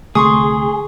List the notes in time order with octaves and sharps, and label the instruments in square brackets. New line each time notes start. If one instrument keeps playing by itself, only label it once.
[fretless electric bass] C2 D3 A3 [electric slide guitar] G#4 [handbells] C6 C#6 D#6